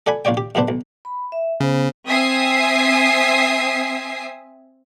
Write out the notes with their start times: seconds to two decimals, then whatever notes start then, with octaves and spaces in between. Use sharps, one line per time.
0.06 A4 D5 F#5 G#5 B5
0.25 A#1 F4 C#5 D5 G5
0.37 G4
0.55 F#2 C#3 B3 D4 C5
0.68 B1
1.05 B5
1.32 E5
1.60 C#3 B3 C5
2.10 C4 E5 G#5 D#6 C7